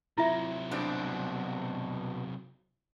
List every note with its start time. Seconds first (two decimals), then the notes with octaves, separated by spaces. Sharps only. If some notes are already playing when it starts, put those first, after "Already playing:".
0.18 C3 F#3 E4 F4 E5
0.71 G2 B2 D4 C5 D5